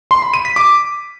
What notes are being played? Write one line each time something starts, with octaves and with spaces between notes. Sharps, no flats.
C6
B5
D#7
B6
D6